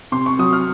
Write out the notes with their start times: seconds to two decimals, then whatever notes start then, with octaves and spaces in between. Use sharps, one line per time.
0.12 C3 C6
0.26 C#6
0.39 F#3 D#6
0.53 F6